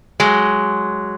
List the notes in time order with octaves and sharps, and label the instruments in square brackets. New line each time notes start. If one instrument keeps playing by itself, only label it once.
[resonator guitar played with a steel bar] F#3 G#3